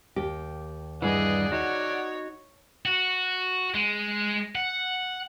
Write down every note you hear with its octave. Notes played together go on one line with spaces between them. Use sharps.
D#2 G4
G2 E3 G#4 D5 D#5 F#5
D#4 F#4 C#5
F#4
G#3
F#5